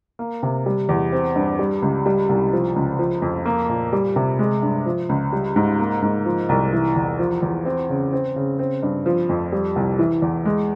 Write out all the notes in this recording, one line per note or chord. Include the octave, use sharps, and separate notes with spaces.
A#3
C3
G3
E2
C4
G2
G3
C#2
G3
C2
F3
C#2
F3
F2
A#3
A#2
G3
C3
G#3
G2
F3
C#2
G3
G#2
A#3
G#2
F3
C2
E3
E2
F3
E2
C4
C#3
C4
C#3
C4
G2
F3
F2
G3
C2
E3
E2
G#3